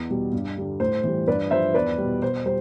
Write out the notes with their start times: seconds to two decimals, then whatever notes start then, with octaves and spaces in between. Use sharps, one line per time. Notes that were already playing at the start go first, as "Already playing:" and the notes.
Already playing: E2
0.09 B2 G3
0.33 G2
0.57 D3 G3
0.80 A2 C5
1.04 E3 G3
1.27 G2 B4 D5
1.51 F3 C5 E5
1.74 E2 B4 D5
1.98 B2 G3
2.22 B2 C5
2.46 G3 C5